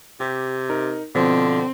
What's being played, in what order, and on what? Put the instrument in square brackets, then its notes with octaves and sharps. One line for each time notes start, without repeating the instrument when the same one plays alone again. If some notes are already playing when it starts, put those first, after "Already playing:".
[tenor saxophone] C3 [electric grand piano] G4
[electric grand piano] D#4 A#4
[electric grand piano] B2 F3 [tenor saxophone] D3 [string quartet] C4